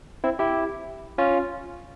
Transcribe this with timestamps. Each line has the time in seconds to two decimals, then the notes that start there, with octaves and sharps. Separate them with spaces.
0.24 C4 E4
0.39 E4 G4
1.18 C#4 F4